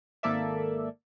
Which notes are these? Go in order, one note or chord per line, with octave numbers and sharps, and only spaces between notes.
G#1 A#3 A4 D5 E5